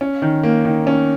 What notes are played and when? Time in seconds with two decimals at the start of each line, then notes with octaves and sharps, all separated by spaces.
0.01 C#4
0.22 D#3
0.43 A#3
0.65 D#3
0.87 C#4